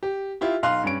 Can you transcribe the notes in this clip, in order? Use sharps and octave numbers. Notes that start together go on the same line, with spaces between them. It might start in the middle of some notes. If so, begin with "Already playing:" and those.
G4
E4 F4 G4
B1 F5 C6 F#6
G2 C#4 D7